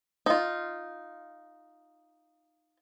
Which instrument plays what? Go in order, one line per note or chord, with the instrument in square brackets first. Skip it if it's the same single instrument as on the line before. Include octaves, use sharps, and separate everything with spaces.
[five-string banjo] D#4 F4